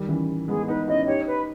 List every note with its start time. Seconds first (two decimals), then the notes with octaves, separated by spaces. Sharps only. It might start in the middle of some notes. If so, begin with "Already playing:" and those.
Already playing: D#3 G3
0.09 C#3 E3
0.48 G#3 B3 G#4
0.68 B3 D#4 B4
0.88 C#4 E4 D#5
1.07 D#4 G4 C#5
1.27 B4